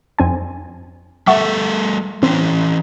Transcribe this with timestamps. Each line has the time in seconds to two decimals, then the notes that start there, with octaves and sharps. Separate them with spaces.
0.19 F2 C4 G#5
1.27 G3 A3 A4 E5 F#5 C#6
2.23 E3 C4 C#4